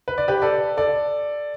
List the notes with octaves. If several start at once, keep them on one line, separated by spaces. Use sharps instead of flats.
B4
D5
G4 B4
A4 D5
A4 D5